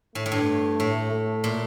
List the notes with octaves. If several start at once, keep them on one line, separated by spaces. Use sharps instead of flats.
A2 A3
A2
G2
A2
A3
A#2